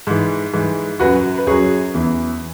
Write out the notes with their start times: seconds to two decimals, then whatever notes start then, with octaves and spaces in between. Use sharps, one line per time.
0.07 G#2 E3
0.54 G#2 E3
1.00 F#2 F#3 F#4 B4
1.38 B4
1.47 F#2 F#3 G#4 C#5
1.94 E2 E3